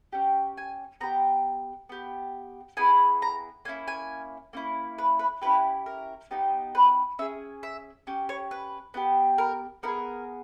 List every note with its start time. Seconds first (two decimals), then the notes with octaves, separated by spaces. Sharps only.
0.12 C#4 G4
0.58 G#5
1.01 B3 G4 A#5
1.89 B3 G4
2.77 B3 E4 G#4 G#5
3.22 A#5
3.65 A#3 C#4 E4 G#5
3.88 G#5
4.53 A#3 C#4 E4
4.98 B4
5.19 B4
5.42 C#4 E4 G4 B4
5.86 A#4
6.31 B3 D#4 G4
6.75 B4
7.19 C#4 G#4 E5
7.63 E5
8.07 C#4 G4
8.29 C#5
8.51 B4
8.94 B3 E4 G4
9.38 A#4
9.83 B3 E4 A#4
9.88 G#4